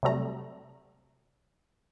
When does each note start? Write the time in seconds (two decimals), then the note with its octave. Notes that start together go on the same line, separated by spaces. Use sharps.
0.03 C3 F#3 G3 A3 A#5